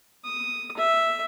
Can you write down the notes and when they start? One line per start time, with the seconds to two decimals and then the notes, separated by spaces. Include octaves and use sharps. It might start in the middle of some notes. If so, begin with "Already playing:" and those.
0.24 D#6
0.77 E5